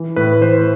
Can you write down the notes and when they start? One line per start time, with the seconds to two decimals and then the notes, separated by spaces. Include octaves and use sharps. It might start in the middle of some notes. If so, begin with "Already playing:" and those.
Already playing: E3
0.16 A2 B4
0.41 E3 C5